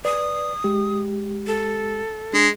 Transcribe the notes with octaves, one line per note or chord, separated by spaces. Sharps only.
B4 D5 D#6
G#3 G4
A4
G#3 D4